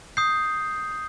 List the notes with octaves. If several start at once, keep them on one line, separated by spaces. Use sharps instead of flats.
D#6 G6 C7